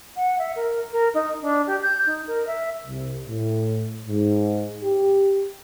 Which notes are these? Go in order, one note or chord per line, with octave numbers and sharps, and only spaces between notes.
F#5
E5
A#4
A#4
D#4
D4
G4
G6
D#4
A#4
E5
C2
A2
G#2
G4